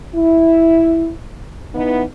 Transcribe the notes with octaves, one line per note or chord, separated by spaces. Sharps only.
E4
E3 B3 D#4